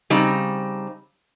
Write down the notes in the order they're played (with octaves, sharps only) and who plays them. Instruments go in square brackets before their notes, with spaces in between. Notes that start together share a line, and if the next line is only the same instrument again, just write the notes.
[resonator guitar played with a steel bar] C#3 G3 C4 D#4